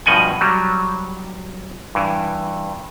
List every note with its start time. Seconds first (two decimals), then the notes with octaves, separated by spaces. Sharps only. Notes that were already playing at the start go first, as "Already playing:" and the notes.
0.06 G2 B2 F3 D#5 F#5 G#5
0.41 F#3 G3
1.95 G2 E3